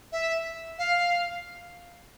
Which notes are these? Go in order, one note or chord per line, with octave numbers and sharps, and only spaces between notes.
E5
F5